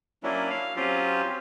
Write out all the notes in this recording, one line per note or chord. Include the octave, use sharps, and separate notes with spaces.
F#3 A#3 C#4 D4 E4
F5
F#3 C4 C#4 F4 G4